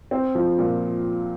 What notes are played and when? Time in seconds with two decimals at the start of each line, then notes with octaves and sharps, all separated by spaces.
0.11 C4
0.35 F3
0.58 A#2